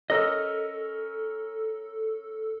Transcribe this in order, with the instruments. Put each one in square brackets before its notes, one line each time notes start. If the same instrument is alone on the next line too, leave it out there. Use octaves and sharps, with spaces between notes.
[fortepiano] C#4 A#4 E6 [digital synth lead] A4 [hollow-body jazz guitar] D#5